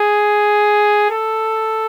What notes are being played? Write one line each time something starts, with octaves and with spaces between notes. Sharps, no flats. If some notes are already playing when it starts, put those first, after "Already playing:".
Already playing: G#4
A4